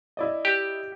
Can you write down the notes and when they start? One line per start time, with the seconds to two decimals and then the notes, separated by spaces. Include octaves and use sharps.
0.17 E4 D5 D#5
0.45 G4